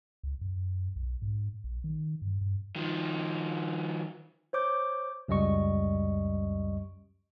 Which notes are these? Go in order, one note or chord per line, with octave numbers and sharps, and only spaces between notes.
C#2
F#2
B1
G#2
A#1
D#3
G2
G2
D#3 F3
C5 C#5 D6 G6
C#2 F#2 G3 D#5 C#6